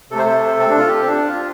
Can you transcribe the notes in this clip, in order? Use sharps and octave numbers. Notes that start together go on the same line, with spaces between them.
C3 A3 A4 C5
A4
C4
D4
F4
G4
C4
D4
F4